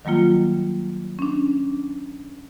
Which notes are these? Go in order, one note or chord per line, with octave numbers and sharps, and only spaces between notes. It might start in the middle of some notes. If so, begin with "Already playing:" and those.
D#3 F#3 G3 A#3 F4
C#4 D4